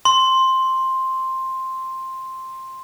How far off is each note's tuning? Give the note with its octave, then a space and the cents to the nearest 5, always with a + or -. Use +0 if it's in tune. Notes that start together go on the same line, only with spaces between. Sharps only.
C6 +5